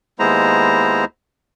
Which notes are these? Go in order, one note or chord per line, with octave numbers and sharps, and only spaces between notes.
D#2 G#3 B3 E4 C5 A#5